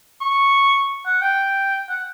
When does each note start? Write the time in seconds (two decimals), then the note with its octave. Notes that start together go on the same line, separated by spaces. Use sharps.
0.21 C#6
1.05 F#5
1.21 G5
1.89 F#5